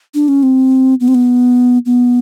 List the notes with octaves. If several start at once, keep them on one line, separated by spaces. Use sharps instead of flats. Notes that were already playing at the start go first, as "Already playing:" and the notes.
D4
C#4
C4
B3
C4
B3
B3